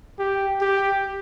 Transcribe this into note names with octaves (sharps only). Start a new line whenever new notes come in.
G4
G4